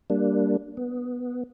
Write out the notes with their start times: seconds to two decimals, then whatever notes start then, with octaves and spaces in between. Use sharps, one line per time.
0.10 G3 A#3 D4
0.77 B3